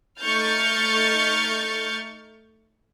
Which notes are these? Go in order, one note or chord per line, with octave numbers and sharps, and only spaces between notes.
A3 D#4 C#6 F6 G6 A6